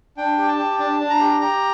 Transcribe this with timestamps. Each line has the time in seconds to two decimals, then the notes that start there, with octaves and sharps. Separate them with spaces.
0.17 D4 G5
0.38 G4
0.48 A5
0.59 G4
0.79 D4 A5
1.00 D4
1.10 A#5
1.20 G4
1.41 G4 A#5